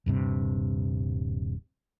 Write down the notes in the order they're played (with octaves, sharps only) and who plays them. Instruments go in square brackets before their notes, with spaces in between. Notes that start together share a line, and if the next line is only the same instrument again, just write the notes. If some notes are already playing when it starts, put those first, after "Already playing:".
[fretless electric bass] D#1 G2 C3